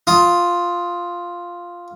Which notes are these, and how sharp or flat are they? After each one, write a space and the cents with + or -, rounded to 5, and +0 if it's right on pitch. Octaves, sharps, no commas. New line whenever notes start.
F4 +0 D#6 +15